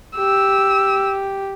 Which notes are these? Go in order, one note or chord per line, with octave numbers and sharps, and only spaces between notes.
G4 E6